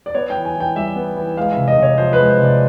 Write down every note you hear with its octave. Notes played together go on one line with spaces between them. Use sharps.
D5
B3 C#5
E3 G5
G#5
E3 G5
G3 E5
B3
E3
G#3 F5
C3 E5
D#5
C3 C#5
F3 C5
B4
G#3
C5
C3
D5